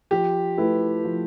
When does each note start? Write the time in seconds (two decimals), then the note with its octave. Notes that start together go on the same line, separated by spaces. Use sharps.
0.11 F3 G4
0.57 A3 E4 B4
1.05 F3